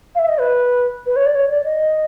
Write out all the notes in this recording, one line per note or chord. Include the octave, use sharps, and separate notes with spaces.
F5
E5
D#5
B4
B4
C#5
D5
C#5
D5
D#5